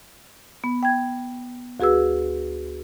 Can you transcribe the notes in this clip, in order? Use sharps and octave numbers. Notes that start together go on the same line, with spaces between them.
B3
G5 G#6
D2 F#4 G#4 B4 E6